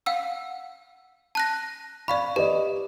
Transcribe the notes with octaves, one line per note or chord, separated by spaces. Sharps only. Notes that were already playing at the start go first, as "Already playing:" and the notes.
F5 F#5 E6
A5 F#6 A#6
D5 F5 B5 C#6
G4 B4 D5 D#5